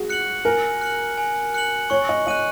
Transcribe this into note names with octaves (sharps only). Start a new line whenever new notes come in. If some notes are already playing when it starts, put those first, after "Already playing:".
Already playing: F#4 G#4
F#6 C#7 F#7
A#4 G#5
F#6 C#7 F#7
G#5
F#6 C#7 F#7
C#5 C#6
D#5
D#5 F#6 D#7 F#7